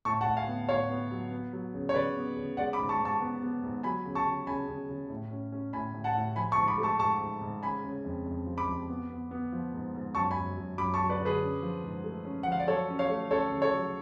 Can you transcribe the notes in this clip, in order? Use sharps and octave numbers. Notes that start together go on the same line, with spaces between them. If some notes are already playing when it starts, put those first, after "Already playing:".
A2 A5 C#6
F#5 A5
A2
F5 G#5
B3
A2 C#5 F5
B3
F#3
B3
F#3
C#3
C#5
C#3 B4 D5
B3
C#3
G#3 D5 F#5
B5 D6
G#2
A5 C#6
G#2
A5 C#6
B3
B3
G#2
F#3 G#5 B5
C#3
A5 C#6
C#3
C#3 G#5 B5
C#3
C#3
A2
C#4
C#4
A2 G#5 B5
A2
F#5 A5
A2
F3 G#5 B5
A5 C#6
G#2
B5 D6
A3
A5 C#6
G#2 A5 C#6
G#2
G#2
C#3 G#5 B5
C#3
F2
F2
F3
B5 D6
F2
B3
B3
B3
F3
G#2
G#2
F#2 A5 C#6
G#5 B5
F#2
F#2
F#2 B5 D6
A5 C#6
F#3
B4 D5
D3
G#4 B4
C#4
F3
G#2
A3
C#4
F#5
F3
F5
D5
F#3 A4 C#5
C#4
C#5 F5
A3
C#4 A4 C#5
C#3
A4 C#5
F#3